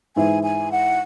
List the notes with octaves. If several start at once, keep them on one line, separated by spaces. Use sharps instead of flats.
G#2 E3 G#3 E4 G#5
G#5
F#5